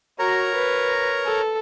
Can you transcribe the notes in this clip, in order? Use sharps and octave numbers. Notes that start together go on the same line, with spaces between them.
F#4 A#4 C#5 A#5
B4
A4